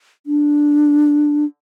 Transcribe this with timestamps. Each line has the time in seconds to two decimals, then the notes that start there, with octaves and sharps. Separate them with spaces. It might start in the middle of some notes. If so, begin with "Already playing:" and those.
0.26 D4